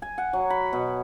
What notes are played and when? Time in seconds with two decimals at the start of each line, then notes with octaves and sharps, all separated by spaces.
0.02 G#5
0.18 F#5
0.33 F#3
0.50 B5
0.73 B2